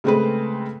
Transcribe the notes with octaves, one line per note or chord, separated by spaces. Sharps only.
C#3 G#3 A3 C4 G#4 B4